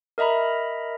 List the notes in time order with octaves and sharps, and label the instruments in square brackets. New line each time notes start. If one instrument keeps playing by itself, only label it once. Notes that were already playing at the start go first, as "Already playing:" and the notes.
[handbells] A#4 D#5 E5 A#5 B5